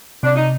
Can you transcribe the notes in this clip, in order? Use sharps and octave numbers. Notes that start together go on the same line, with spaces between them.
C3 D4
D#4